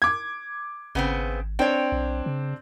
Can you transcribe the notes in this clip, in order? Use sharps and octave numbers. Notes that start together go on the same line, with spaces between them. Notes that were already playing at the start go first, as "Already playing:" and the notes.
D6 G#6
G#1 C#3 B3 C4
C4 D4 C#5 G5
B1
C#3